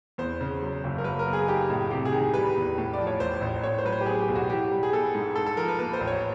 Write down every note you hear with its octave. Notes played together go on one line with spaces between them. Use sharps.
E2 C5
C#3
F#3
F#1
A#4
F#3 B4
A#4
B3
G#4
D#4 G4
A2
C3 G4
G#4
D#3
G#4
G3 B4
E2
A2
D5
F3
C#5
A1 C5
A1
A2 C#5
C5
F#3 B4
C5
G4
B3 G#4
G4
B1
F#4
E3 G4
G3
G#4
B3 A4
G#2
G#2 A4
A4
F3 A#4
B4
A#3 B4
C5
A1
C#5